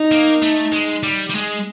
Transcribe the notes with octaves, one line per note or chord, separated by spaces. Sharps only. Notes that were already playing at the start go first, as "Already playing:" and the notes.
Already playing: D#4
A#3
A3
G#3
G3
G3
G#3